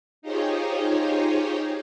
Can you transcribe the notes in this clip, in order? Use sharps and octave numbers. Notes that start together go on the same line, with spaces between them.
D#4 F4 G4 G#4 C5 C#5